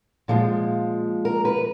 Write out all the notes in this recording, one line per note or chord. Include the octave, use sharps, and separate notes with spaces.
A#2 F3 G#3
A#4
B4